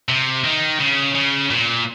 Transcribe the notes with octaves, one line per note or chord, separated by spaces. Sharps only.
C3
D#3
C#3
C#3
A#2